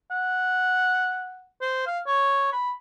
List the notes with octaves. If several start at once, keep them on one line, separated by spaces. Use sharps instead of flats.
F#5
C5
F5
C#5
B5